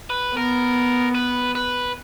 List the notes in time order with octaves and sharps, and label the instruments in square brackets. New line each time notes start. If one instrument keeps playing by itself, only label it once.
[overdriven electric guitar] B4
[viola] B3 [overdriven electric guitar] A#4
[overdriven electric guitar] B4
B4